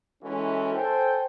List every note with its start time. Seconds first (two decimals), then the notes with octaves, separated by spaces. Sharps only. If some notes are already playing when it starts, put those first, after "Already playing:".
0.23 E3 G#3 C#4 E4 F#4 A4
0.73 A4 C5 G5 G#5